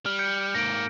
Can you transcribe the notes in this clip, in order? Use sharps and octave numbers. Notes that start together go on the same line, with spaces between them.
G3 F6
G6 C#7
G#2 A#3 A#6 D7